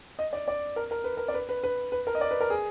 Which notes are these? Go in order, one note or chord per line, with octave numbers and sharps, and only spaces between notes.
D#5
D5
D5
A#4
A#4
B4
A#4
D5
B4
B4
B4
B4
A#4
D#5
D5
B4
A#4
G#4